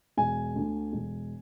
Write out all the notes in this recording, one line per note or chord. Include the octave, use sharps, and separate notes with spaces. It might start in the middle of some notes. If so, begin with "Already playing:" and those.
E1 G#5
D2 D3
E1